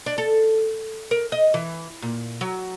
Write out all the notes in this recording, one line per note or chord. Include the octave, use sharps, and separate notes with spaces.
D4
A4
A#4
D#5
E3
A#2
F#3